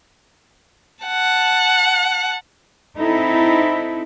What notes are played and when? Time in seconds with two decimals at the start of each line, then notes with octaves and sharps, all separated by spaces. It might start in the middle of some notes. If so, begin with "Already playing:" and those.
1.05 F#5 A5
2.98 C4 D#4 E4 A4